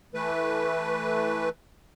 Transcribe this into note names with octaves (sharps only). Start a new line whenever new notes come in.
E3 A3 B4